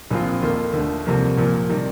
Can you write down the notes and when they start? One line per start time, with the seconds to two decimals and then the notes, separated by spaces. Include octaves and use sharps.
0.11 A#1 A#2 F3 C4 F4
0.42 D#2 D#3 A#3 F4 A4
0.73 D#2 D3 A3
1.06 C2 C3 F3 A#3
1.37 A#2 F3 A#3
1.69 C3 D#3 G3